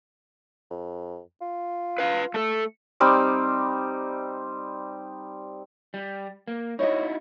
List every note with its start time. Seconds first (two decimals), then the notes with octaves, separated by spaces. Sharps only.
0.70 F2
1.41 F4
1.98 B4 F5
2.34 A3 A4
3.00 G3 C4 D#4 D6
5.94 G3
6.48 A#3
6.79 D#4 E4 F#4 C#5 D#5